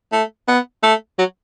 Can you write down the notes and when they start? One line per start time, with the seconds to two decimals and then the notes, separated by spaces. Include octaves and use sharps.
0.12 A3
0.48 B3
0.83 A3
1.18 F#3